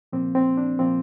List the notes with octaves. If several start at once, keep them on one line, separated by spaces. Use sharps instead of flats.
A#2 F3 A#3 C4
C4
D4
A#2 F3 A#3 C4 F4